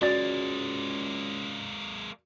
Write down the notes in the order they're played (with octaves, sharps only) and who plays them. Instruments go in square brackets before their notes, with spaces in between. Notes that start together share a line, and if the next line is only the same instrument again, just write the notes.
[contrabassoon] C#2 [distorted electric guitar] G#3 A#3 [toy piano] F#4 [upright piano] D5 A6